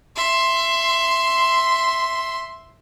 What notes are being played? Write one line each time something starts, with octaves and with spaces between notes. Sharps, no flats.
E5 C6